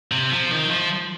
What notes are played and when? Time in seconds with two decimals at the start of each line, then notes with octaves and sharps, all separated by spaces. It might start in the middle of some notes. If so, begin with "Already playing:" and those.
0.12 C3
0.32 F3
0.51 D#3
0.71 F3